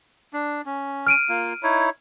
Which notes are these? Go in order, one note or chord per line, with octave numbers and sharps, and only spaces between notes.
D4
C#4
F6 D7 D#7
A#3 F4
D#4 E4 C#5